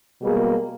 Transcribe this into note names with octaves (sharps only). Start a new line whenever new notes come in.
B2 G3 G#3 A#3 G#4